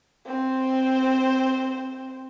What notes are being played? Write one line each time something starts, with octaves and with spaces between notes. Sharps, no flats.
C4 C5